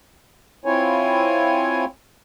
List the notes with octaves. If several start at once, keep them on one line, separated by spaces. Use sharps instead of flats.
C4 E4 F4 C#5 G#5